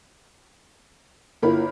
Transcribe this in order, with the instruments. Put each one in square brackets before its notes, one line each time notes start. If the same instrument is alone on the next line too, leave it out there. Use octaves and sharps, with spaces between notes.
[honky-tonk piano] G1 A#4 B5 [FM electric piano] A#3 E4 F4